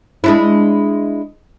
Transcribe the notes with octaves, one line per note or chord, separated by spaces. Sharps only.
G#3 D4 E4